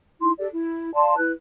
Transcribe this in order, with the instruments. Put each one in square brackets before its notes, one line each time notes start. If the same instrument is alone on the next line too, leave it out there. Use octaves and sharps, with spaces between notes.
[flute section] D#4 E4 C6
G4 A4 D5
E4
D5 F5 A5 C6
E4 B4 F#6